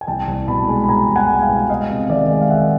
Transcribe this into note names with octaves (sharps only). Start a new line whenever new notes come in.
G#5
C2 G5 A5
C2
B2 A5 B5
G#3
B5
B2 G#5 A#5
C2
F#5 G#5
G#3
F5 G5
B2
G#3 D#5 F5
C3
D#3 D5 E5
G#3
F5
D#3 E5 F#5